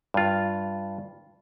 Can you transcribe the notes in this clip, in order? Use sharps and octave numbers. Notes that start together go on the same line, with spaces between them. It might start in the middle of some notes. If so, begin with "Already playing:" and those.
G2 F4